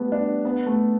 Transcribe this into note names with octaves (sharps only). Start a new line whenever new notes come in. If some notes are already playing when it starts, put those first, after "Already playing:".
Already playing: G3 A3 B3
D4
B3
A3